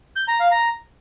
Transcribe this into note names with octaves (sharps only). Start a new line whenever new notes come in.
G6
A#5
F5
A#5